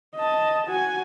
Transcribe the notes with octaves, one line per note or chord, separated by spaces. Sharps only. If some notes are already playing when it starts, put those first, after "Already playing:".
D#5 A5
F#4 G#5